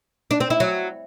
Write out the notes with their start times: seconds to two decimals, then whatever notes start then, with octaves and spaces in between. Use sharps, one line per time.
0.31 D4
0.40 C4
0.50 E4
0.60 F#3